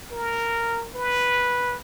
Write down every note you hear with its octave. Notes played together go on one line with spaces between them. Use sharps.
A#4
B4